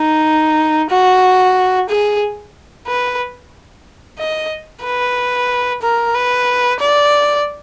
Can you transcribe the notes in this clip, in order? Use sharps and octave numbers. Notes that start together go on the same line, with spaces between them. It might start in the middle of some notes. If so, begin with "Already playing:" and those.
Already playing: D#4
F#4
G#4
B4
D#5
B4
A#4
B4
D5